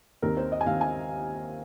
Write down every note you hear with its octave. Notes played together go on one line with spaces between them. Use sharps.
D#2 D#3 C4 A#4
C5
D#5
G#5
D#2 D#3 C4 F5
G#5